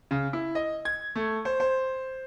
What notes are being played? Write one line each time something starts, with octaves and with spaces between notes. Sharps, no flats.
C#3
E4
D#5
G#6
A3
C5
C5